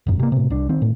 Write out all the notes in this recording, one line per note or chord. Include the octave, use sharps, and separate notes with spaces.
E1 F#2
C3 A#3
A2 C3
C2 D4
D#3 C4
A2